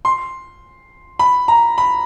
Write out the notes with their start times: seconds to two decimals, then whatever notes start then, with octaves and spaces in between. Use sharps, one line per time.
0.05 C6
1.19 B5
1.48 A#5
1.78 B5